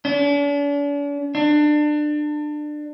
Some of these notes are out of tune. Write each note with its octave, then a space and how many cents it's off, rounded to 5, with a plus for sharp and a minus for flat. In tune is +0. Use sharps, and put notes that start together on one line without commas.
D4 -45
D4 +25